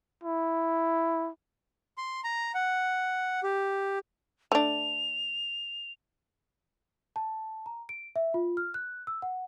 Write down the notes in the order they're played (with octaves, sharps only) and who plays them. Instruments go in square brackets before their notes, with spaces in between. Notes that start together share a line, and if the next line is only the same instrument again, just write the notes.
[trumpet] E4
[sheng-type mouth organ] C6
A#5
F#5
G4
[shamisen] A3 D4 [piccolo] F7
[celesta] A5
A#5
D7
E5
F4
F6
F#6
E6
F#5